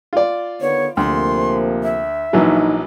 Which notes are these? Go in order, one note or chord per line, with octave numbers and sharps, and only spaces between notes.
F4 D5
D#2 D3 B3 C#5
D2 C3 F3 A#3 C6
E5
A#1 E3 F#3 D#4